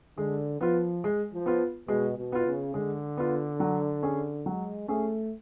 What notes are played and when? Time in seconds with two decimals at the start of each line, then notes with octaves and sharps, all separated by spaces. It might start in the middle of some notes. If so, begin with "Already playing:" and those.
0.17 D3 G#3
0.60 F3 B3 F4
1.04 G#3
1.32 F3
1.46 B3 F4
1.88 B2 G#3
2.18 B2
2.32 B3 F4
2.46 C#3
2.74 D3 G#3
3.17 B3 F4
3.60 F#3
4.03 C#4 G#4
4.45 F#3 G#3
4.88 A3 C#4 G#4